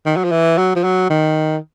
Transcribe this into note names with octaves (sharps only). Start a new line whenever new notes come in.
D#3
F#3
F3
E3
F#3
F3
F#3
D#3